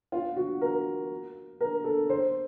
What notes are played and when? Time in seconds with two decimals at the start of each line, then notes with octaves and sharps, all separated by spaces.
0.12 F4
0.36 F#4
0.61 A#4
1.61 A#4
1.84 A4
2.10 C5